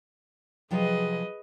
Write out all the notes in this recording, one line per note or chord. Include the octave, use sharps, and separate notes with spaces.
C3 F3 F#3 G#4 B4 D#5